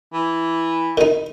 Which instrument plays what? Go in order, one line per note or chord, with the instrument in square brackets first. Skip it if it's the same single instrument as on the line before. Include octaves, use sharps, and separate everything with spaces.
[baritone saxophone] E3
[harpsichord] D#3 D#4